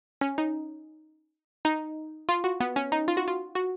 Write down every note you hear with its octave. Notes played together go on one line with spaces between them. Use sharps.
C#4
D#4
D#4
F4
F#4
B3
C#4
D#4
F4
F#4
F4
F#4